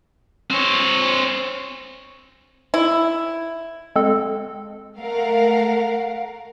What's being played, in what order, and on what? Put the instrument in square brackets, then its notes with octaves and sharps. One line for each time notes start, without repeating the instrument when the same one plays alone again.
[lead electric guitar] C4 C#5
[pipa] E4
[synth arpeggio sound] G#3 C4 A4
[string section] A3 A#4 F5 F#5